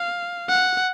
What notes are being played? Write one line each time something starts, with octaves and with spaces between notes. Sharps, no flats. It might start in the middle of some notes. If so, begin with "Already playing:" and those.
Already playing: F5
F#5